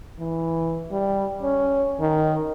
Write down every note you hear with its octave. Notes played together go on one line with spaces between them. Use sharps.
E3
G3
C#4
D#3